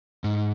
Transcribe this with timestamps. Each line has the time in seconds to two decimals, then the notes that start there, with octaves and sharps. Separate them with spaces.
0.24 G#2